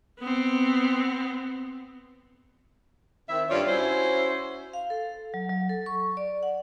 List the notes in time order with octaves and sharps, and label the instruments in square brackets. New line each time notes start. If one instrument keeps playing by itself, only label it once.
[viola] B3 C4
[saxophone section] D#3 C4 E5
G2 F4 C#5 D5
C#4 E4 F#4 C5
[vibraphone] F5
A4
F#3
F#3
A4
C#6
D5
F#5